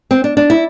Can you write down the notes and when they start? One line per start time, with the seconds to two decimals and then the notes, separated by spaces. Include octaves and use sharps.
0.11 C4
0.24 D4
0.37 D4
0.50 E4